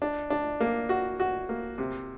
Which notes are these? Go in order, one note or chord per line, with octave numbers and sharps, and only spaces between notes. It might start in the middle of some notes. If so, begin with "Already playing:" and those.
D4
D4
A#3
F#4
F#4
A#3
C3